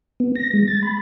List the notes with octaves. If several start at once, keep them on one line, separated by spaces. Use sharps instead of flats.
B3
A#6
G#3
A6
B5